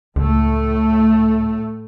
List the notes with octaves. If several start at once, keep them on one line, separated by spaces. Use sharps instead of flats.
C#2 A2 A3